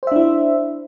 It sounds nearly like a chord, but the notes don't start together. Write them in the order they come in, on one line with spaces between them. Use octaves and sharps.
C5 E5 D4 E4